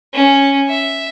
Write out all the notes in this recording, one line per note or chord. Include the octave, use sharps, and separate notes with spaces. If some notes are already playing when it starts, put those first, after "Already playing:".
C#4
E5